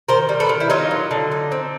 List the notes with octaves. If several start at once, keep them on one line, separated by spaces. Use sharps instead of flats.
D#3 A#4 C5
G3
A4 B4
D#3
E4
F#3 D#4 F4
F#3
D3
D#4
C4